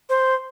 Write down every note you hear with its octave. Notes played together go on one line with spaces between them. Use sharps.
C5